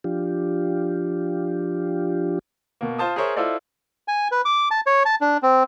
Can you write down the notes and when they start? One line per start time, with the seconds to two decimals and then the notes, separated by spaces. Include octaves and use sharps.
0.04 F3 D4 F4 G4
2.81 B2 A#3
2.99 F4 C5 A5 D#6
3.16 G#4 A#4 C5 C#5 E5
3.36 E4 F4 A4 C5 D5 D#5
4.08 G#5
4.32 B4
4.45 D6
4.71 A5
4.86 C#5
5.05 A5
5.21 D4
5.43 C4